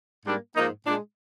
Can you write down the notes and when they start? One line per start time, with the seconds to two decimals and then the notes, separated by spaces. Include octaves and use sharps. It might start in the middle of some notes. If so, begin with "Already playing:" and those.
0.25 G#2 G3 A#3 D4
0.55 G#2 F3 A#3 D#4
0.86 A#2 G#3 D4